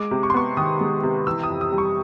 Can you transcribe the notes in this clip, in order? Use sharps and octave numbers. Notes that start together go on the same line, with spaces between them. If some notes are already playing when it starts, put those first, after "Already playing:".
Already playing: G#3 D6
C3
C#6
C6
B3 C#6
D#3 D#6
G#3
C3
E3 E6
D#6
F2
D#6
G3
C#6